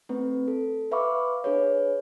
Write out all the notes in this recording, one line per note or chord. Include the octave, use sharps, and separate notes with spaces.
A3 C4 B4
A4
B4 E5 F5 B5 C#6 D6
D4 G#4 B4 C#5